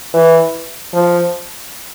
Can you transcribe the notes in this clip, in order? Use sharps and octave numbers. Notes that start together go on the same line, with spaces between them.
E3
F3